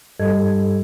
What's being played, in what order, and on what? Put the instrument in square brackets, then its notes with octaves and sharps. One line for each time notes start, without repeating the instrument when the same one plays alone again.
[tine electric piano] G2 G3 G4 A4 D#5 G#6